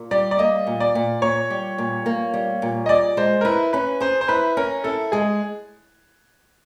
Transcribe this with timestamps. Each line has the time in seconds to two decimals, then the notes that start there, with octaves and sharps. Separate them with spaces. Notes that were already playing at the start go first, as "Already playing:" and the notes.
Already playing: A#2
0.11 G3 D5
0.31 D5
0.39 A#3 D#5
0.67 A#2
0.80 D5
0.95 A#2
1.22 A#2 C#5
1.50 G3
1.78 A#2
2.06 A#3
2.34 G3
2.62 A#2
2.86 D#5
2.89 G#4 D5
3.17 G#3 C5
3.41 A#4
3.45 E4 B4
3.73 C#4 B4
4.00 G#4 C5
4.21 C5
4.28 E4 B4
4.57 C#4 A#4
4.84 E4 A4
5.12 G#3 G#4